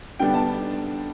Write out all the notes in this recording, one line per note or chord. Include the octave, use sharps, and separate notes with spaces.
D3 G3 B3 D4 G5
A5